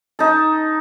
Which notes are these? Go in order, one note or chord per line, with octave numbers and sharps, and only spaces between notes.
D#4 A4